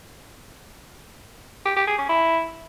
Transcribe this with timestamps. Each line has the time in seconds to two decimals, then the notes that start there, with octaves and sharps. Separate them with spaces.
1.66 G4
1.77 G4
1.88 G#4
1.98 C#4
2.09 E4